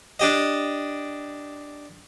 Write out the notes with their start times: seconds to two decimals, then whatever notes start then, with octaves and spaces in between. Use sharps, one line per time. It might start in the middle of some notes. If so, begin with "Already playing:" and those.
0.20 D4 G4 D#5